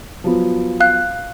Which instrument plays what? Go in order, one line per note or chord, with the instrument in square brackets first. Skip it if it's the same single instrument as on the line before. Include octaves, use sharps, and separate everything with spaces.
[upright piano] F3 F#3 B3
[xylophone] F5 F#6